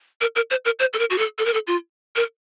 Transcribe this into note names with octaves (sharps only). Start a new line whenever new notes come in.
A#4
A#4
C5
A#4
C5
A4
A#4
F#4
A4
A4
A#4
A4
F4
A#4